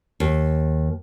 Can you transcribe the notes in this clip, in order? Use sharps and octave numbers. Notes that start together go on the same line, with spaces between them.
D#2